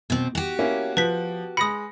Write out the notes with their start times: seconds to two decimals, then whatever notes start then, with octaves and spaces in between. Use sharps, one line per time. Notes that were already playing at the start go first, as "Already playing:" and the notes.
0.10 B2 C4
0.35 F#4 G4
0.59 A#3 C#4 E4
0.97 F3 B4 B6
1.57 G#3 B5 D#6 A#6 C#7